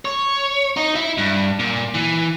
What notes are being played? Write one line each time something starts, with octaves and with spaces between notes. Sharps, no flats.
C#5
D#4
E4
G2
A#2
E3